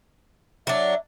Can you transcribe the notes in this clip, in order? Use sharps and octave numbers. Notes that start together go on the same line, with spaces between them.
F#3 D4 E5